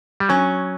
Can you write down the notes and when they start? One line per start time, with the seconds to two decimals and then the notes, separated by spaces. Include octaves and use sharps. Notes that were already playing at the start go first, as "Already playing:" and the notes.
0.20 G3
0.29 F#3 C#4